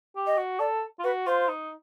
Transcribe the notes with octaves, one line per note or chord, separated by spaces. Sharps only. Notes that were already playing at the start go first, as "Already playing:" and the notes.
G4
D#5
F#4
A4 D5
F4
F#4 B4
F4 C5
D#4